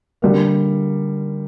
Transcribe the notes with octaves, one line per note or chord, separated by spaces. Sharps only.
D3 G3 A#3